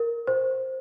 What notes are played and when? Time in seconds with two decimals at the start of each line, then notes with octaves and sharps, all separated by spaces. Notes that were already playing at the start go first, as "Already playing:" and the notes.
Already playing: A#4
0.27 C5